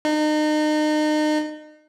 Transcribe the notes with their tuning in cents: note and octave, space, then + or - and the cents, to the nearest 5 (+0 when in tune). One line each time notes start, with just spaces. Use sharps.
D#4 -35